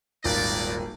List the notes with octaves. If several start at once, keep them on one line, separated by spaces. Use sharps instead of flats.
D#1 G#1 G#3 B3 F4 D5